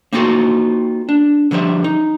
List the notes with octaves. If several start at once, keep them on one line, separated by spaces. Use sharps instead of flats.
A#3 C4 D#4 F4 F#4 A4
D4
D3 F3 G3 C5 E5
D#4